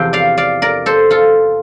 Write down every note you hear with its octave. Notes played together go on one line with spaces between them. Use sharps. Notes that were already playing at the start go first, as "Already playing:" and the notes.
Already playing: E2 C3 F3 G5
D5 F5
D5 F5
A#4 D5
A4 C5
F4 A4